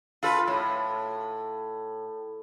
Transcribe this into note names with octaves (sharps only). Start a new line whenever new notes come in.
F4 A4 B4
A2